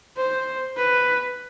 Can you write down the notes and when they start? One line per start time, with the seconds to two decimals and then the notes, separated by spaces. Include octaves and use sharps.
0.17 C5
0.77 B4